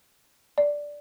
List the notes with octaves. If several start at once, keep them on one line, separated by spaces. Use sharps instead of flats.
D5